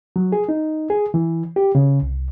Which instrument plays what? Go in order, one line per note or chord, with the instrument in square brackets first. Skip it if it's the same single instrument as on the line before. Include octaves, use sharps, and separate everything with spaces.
[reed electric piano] F#3
G#4
D#4
G#4
E3
G4
C#3
C2